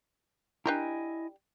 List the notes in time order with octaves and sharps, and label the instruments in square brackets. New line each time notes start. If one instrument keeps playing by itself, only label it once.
[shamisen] D4 G4 A#4 [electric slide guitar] E4 D#5 G#5